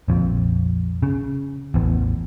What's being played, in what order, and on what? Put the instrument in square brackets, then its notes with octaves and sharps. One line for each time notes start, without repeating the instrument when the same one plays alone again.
[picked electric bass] A#1 F2
C#3
A1 E2